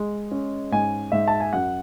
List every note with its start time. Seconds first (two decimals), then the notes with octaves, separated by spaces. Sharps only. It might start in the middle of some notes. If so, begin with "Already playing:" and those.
Already playing: G#3
0.31 C#4
0.72 G#2 G#5
1.12 G#2 E5
1.28 A5
1.40 G#5
1.53 F#2 F#5